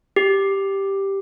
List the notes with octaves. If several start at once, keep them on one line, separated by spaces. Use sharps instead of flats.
G4